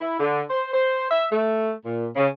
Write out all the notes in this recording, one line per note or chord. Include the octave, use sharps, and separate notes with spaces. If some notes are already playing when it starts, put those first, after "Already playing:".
E4
D3
C5
C5
E5
A3
A#2
C#3